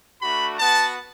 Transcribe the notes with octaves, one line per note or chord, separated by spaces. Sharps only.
A3 D4 F#4 B5
B3 F#4 A5